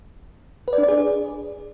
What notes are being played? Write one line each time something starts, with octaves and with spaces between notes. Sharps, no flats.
B4
D5
D4
D5
G#4